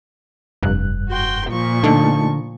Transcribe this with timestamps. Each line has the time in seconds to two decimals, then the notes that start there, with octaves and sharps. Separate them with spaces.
0.63 F1 G2 F#6
1.09 F#4 G5 C6
1.48 A#2 F3 C#6
1.84 D3 A3 D#4 A5